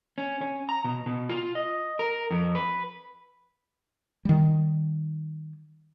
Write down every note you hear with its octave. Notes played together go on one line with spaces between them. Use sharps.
C#4
C#4
A#5
B2
B2
F4
D#5
A#4
F2
B4
D#3 G3